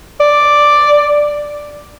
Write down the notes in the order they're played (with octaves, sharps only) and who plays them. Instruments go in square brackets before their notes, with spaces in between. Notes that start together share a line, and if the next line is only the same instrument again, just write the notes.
[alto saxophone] D5